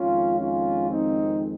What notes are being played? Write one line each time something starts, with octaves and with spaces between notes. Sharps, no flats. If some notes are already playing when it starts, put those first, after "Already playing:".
Already playing: F2 D#3 G#3 C#4 F4
C#4 F4
C4 D#4